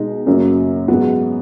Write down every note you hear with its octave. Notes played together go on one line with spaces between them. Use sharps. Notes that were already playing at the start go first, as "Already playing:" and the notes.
Already playing: B2 G#3 D#4
F#2 C#3 F#3 A#3
G#2 F#3 B3